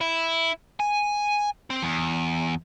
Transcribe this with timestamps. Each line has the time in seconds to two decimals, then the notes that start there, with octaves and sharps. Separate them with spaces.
0.01 E4
0.80 G#5
1.70 C4
1.83 E2